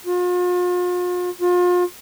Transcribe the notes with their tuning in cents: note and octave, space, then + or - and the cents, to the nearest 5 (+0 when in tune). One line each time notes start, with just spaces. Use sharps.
F4 +40
F4 +35